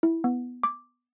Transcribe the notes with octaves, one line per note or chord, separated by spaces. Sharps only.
E4
B3
D6